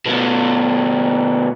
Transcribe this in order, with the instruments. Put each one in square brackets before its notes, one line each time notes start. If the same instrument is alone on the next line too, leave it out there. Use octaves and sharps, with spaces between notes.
[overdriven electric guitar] B2 A3